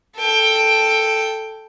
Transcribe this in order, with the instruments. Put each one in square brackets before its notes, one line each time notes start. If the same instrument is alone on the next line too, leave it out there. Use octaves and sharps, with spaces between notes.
[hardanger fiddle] A4 G5